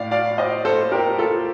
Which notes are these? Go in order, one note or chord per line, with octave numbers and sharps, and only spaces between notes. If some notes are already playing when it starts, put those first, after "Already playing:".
Already playing: A2 D5 F5
D5 F5
C5 D#5
A4 C5
G4 A#4
F4 A4